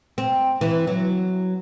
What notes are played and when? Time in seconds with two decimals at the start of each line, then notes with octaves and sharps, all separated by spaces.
0.18 C4
0.61 E3
0.87 F#3